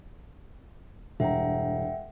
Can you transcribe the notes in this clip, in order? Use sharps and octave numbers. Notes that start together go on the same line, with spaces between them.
E1 G2 E5 F#5 G5 A#5